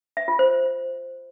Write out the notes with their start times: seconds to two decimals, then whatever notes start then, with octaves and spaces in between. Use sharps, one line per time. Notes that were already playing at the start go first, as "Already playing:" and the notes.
0.17 E5
0.28 F4
0.39 C5